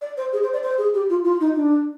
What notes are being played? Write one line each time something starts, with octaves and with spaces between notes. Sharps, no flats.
D5
C5
G#4
C5
D5
C5
G#4
G4
F4
F4
D#4
D4